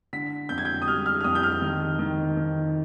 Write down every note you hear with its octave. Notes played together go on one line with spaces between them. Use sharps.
D3 B6
F2 G6
G#6
G6
D#6
G3 F6
F6
F6
F2 D#6
G6
F6
D#3
D#3
D#3